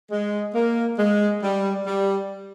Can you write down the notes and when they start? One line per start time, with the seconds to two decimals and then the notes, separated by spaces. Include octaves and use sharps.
0.11 G#3
0.54 A#3
0.98 G#3
1.42 G3
1.86 G3